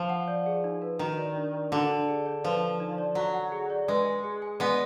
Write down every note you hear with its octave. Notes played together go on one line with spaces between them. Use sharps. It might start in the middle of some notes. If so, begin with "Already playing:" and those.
Already playing: F3
F#5
D5
G#4
D#4
B4
D#3 F#4
D5
D4
D5
D3 F#4
D4
G#4
D5
F3 B4
F5
D#4
D5
F#3 F#4
F#5
G#4
D5
G#3 B4
G#5
G#4
G#5
G#3 B3 D5